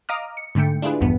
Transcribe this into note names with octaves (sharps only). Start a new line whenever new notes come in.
D#5 F5 A#5 D6 D#6 F6
C#7
G#2 D3 A3 G5 C#7
D4 E4 F4 G4 G#4 B4
A#1 E2 G2 B3